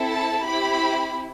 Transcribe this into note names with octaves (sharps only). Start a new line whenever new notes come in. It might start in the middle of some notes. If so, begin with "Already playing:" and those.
Already playing: C4 E4 A4
A5
C4 E4 G4 B5